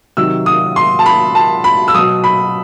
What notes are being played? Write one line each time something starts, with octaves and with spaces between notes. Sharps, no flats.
C3 D#3 F#3 E6
D#6
C6
A5
B5
A5
B5
E6
B2 F#3 D#6
B5